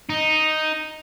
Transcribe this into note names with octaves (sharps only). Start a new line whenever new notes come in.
D#4